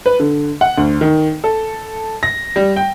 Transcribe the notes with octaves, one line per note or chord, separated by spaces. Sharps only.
B4
D3
F#5
D2
D#3
A4
A#6
G3
G5